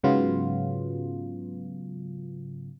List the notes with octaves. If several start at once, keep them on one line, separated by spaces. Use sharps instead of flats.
G#2 C#3 F#3 B3 F4